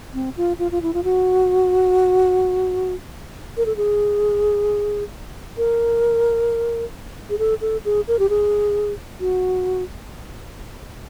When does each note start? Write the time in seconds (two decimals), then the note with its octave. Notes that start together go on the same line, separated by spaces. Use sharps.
0.14 C4
0.37 F4
0.59 F4
0.72 F4
0.82 E4
0.94 F4
1.04 F#4
3.57 A#4
3.66 A4
3.77 G#4
5.58 A#4
7.30 G#4
7.39 A4
7.61 A4
7.85 G#4
8.08 A#4
8.19 G4
8.29 G#4
9.20 F#4